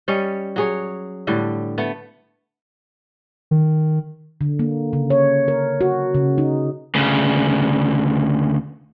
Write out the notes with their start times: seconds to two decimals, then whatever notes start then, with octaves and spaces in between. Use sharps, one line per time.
0.08 G3 C#4 C#5 D#5
0.56 F#3 G#4 C#5
1.27 A2 D3 G3
1.78 A3 B3
3.51 D#3
4.41 D3
4.59 A#3
4.93 C#3
5.10 C#5
5.48 A#4
5.81 F#4
6.15 C#3
6.38 D#4
6.95 D2 C#3